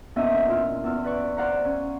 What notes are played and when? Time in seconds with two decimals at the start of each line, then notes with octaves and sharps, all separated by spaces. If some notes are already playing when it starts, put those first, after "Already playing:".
0.16 E2 A#2 C#4 D4 D#5 E5
0.48 E4 F4 F6
0.84 E2 E6 F6
1.04 B4 D5 C#6
1.37 C5 D5 F5 F#5 A#5
1.65 C#4